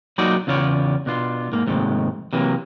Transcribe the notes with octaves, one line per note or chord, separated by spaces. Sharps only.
F#3 A#3 D#4 F4 F#4 D5
E2 C#3 F4 C#5 D5
B2 D4 F4
G#2 A#3
D#2 G#2 C3 F3 A3
C3 E3 F#3 A#3